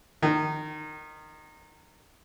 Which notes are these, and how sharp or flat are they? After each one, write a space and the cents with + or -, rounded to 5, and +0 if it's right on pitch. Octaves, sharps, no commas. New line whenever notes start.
D#3 -20